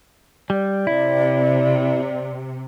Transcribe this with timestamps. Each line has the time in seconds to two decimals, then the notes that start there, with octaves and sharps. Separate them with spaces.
0.50 G3 D5
0.87 C3 E4